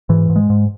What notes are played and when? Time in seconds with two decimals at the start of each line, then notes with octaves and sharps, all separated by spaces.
0.09 G#2 E3
0.30 G#2
0.36 G#3
0.50 G#2